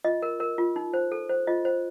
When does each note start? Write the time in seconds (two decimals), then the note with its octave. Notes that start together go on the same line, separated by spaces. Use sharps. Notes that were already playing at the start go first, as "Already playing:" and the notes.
0.04 F4 D#5
0.22 A#4
0.40 A#4
0.58 F4
0.76 D#4
0.94 C5
1.12 A4
1.29 C5
1.47 F4 D#5
1.65 C5